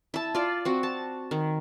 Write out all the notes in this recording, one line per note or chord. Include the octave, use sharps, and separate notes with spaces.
E4 A5
F4 D5
C4 F#4
A5
D#3